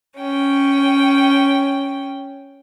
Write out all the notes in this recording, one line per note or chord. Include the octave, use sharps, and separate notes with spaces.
C#4 G5